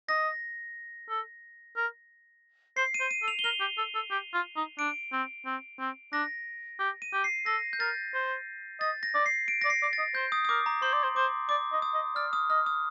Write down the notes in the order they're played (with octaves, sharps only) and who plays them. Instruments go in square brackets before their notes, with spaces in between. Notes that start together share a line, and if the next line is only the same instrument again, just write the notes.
[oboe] D#5 [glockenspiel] A#6
[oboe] A4
A#4
[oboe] C5 [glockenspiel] C7
[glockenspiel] D#7
[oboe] C5
[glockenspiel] D#7
[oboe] A4
[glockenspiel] F7
G7
[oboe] A#4 [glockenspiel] F7
[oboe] G4
A4
A4
G4
F4
D#4
[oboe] D4 [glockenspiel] D7
[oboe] C4
C4
C4
[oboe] D4 [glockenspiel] A#6
[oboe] G4
[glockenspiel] D#7
[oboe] G4
[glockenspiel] C7
[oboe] A4 [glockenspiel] A#6
[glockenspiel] G6
[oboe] A#4 [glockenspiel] A6
[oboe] C5
[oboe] D#5 [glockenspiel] A6
[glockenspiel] A#6
[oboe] D5
[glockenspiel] C7
D7
[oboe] D5 [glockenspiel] A#6
[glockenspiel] C7
[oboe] D5
[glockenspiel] A6
[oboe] D#5
[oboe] C5 [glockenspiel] G6
[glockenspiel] D#6
D#6
[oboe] A#4 [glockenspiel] D6
[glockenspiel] A#5
[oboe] C5 [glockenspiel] C6
[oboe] D5
C5
[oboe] C5 [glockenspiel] D6
[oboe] D5 [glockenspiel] D6
[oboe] D#5
[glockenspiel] D#6
[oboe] D#5
[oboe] D5 [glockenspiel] F6
[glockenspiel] D#6
[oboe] D#5 [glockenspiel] F6
[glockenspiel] D#6